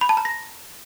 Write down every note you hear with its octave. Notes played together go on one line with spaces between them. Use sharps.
B5
A5
A#5
A#6